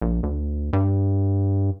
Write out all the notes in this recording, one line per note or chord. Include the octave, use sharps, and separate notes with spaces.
A#1
D2
G2